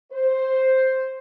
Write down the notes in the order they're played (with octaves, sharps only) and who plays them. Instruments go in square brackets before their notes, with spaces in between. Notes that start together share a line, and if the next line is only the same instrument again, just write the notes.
[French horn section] C5